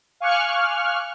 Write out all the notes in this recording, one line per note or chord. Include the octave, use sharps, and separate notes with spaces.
F5 G#5 C#6 D6 F6 F#6